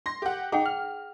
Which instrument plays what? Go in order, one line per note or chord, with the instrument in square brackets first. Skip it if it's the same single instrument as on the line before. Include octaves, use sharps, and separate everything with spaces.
[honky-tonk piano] C6 A#6
G4 F#5
[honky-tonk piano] D#4 [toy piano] G#4 F#5 G5
[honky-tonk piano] F6